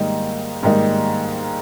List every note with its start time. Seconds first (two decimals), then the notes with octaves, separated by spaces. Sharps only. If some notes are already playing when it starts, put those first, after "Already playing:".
Already playing: G#2 D#3 G3 A#3 D#4
0.63 G#2 D#3 G3 A#3 D#4